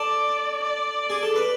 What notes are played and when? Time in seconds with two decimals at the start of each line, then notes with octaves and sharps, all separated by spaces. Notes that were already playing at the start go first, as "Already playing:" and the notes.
Already playing: A4 D5
0.63 D5
1.10 G#4
1.23 A4
1.36 B4